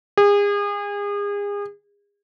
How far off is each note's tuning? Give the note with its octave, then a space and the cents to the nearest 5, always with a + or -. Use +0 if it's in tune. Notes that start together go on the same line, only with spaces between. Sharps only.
G#4 -35